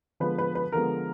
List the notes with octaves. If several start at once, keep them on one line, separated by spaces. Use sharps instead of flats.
D3 F3 G#3 B3 B4
B4
B4
D3 F3 G#3 B3 A#4